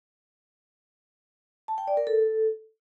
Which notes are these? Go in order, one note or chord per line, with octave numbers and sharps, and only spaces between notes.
A5
G5
D5
A#4
A4